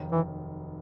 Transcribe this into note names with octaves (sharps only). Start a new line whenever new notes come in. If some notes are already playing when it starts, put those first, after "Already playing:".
Already playing: F1 D#2 D#3 F#3
E3